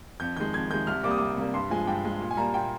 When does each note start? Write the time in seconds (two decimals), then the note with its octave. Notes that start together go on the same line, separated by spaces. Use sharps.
0.20 F2 G6
0.37 D#3 G#3 G6
0.54 F2 G#6
0.70 D#3 G#3 G6
0.87 C2 F6
1.03 C3 G3 A#3 D6
1.11 D#6
1.17 C2 D6
1.37 C3 G3 A#3
1.53 G2 C6
1.70 F3 G#3 G#5
1.87 G2 G5
2.05 F3 G#3
2.21 A#2
2.31 G#5
2.37 G3 A#3 A#5
2.54 A#2 G5